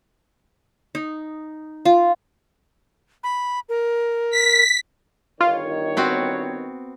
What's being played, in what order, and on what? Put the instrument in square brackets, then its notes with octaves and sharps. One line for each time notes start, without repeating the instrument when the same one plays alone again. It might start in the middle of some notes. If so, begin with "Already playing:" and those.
[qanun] D#4
F4
[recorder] B5
A#4
[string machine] B6
[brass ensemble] G1 D#3 C#5 [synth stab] F4
[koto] B3 C4 F#4